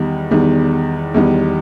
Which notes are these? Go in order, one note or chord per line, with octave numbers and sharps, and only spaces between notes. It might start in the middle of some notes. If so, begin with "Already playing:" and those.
Already playing: E2 D#3 G3 B3
E2 D#3 G3 B3
E2 D#3 G3 B3